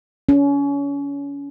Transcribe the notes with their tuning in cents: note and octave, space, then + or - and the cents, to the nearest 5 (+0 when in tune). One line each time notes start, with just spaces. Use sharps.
C#4 +30